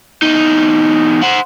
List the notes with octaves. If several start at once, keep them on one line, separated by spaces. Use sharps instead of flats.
E2 D#4
C5 F#5